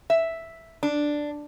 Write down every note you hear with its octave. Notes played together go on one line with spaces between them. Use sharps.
E5
D4